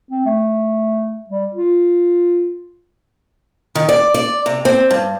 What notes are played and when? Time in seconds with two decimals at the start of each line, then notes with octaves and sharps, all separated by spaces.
0.11 C4
0.26 A3
1.29 G3
1.54 F4
3.75 D#3
3.89 D5
4.14 D5
4.46 C3
4.65 C4
4.91 G2